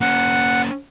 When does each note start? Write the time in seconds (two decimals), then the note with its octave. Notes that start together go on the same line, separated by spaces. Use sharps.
0.01 A#3 C#4 F#5